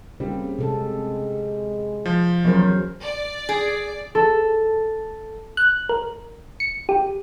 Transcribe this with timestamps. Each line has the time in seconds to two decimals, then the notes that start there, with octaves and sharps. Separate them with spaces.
0.20 C#3 G3 A#3 C4
0.58 C3 G#3 A4
2.05 F3
2.45 E2 C#3 F#3 C#4 A#4 C5
3.03 D5
3.49 G#4
4.15 A4
5.57 F#6
5.89 A#4
6.60 C#7
6.89 G4